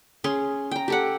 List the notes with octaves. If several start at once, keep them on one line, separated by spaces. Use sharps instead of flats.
C#4 G#4 C6
G5 A#5
G4 A4 F#5